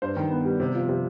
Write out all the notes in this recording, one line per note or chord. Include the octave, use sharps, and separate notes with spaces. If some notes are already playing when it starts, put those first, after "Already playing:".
G2 C5
D#3
B3
G3
C3
F3
C3